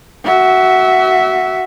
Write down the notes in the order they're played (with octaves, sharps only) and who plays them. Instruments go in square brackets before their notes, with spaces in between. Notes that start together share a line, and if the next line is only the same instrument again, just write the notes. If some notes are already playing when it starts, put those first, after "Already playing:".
[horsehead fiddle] F#4 E5